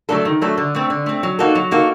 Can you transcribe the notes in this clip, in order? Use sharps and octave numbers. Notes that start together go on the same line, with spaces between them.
F#3 A3 D4 A4
D#3
F#3 A3 D4 A4
D3
A3 C4
D3
A3 C4
F#3
A#3 D#4 F#4 A4
F#3
A#3 D#4 F#4 A4